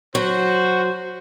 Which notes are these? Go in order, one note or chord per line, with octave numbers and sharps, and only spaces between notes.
F#3 F#4 C5